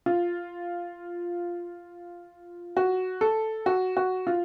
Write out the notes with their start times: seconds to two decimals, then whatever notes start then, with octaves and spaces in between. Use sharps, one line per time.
0.06 F4
2.77 F#4
3.21 A4
3.66 F#4
3.97 F#4
4.27 F4